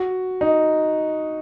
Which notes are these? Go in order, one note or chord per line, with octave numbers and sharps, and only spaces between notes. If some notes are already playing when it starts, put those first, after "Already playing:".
Already playing: F#4
D#4